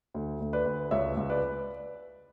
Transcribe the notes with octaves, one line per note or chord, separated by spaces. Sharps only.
D2
D2
B4 D5
D2
C#2 C#5 E5
C#2
B4 D5